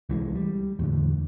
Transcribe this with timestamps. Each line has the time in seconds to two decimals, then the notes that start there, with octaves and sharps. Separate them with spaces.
0.09 C2 E3 F3 G#3
0.35 G3
0.79 E2 A2 D3